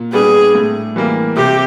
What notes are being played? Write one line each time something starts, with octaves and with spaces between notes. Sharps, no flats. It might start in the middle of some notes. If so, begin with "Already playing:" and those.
Already playing: A#2
G3 B3 D4 G#4
A2
E3 G3 A#3
C3 G4